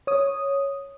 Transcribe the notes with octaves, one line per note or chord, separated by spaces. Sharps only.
C#5 D#6